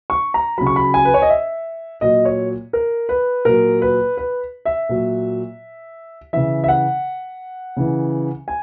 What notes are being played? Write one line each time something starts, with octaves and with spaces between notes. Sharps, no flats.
C#6
A#5
C#3 F#3 B5
C#6
B5
G#5
B4
C#5
D#5
E5
A#2 F#3 D#5
C#5
A#4
B4
A#2 F#3 A#4
B4
B4
E5
A#2 F#3
C#3 E3 E5
E5
F#5
C#3 E3
G#5